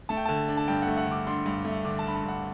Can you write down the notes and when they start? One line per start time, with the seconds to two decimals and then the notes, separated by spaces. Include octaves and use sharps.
0.09 A3 A5
0.17 G5
0.25 D3 A5
0.48 D4
0.57 A5
0.68 G2 G5
0.82 F#5
0.87 A3
0.98 F#5
1.06 D3
1.11 D6
1.27 D4 C6
1.46 G2
1.65 A3
1.85 D3 D6
1.99 A5
2.04 D4 B5
2.15 A5
2.23 G2 F#5